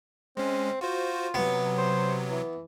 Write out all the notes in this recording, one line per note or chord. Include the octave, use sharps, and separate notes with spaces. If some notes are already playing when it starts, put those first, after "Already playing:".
G#3 C4 C#4
F4 F#4 C5
C3 F#3 B3
C5
E3